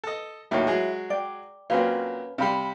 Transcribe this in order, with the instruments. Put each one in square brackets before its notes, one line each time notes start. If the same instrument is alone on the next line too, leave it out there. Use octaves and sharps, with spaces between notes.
[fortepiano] A4 D#5
[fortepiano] D#2 A2 F#3 [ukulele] E4 C#5
[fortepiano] F#3 G#3 G#4
[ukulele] D5 G5
[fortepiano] A#2 F#3 C4 [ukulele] C#4 B4 F5
[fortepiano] C3 G3 [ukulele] F5 B5